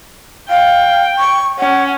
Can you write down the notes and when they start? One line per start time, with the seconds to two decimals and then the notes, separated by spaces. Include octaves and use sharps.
0.50 F5 G5
1.18 C#6
1.59 C#4 F#5